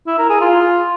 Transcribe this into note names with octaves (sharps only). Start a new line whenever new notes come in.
E4
A#4
G#4
F4